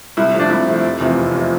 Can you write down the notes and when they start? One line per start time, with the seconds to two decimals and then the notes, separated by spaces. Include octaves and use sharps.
0.17 C2 E4
0.34 C3 F3 A3
0.40 D4
0.50 C2 E4
0.67 C3 F3 A3
0.84 F1
1.01 E2 C3 F3 A3
1.17 F1
1.35 C3 F3 A3